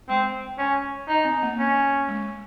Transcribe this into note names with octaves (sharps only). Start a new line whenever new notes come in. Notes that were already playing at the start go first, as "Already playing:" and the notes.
G#3 C4
C#4
D#4
C4
A#3
C#4
G#3